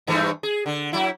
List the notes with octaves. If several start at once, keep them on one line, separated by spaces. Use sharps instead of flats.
G2 E3 A3
G#4
D3
F#3 E4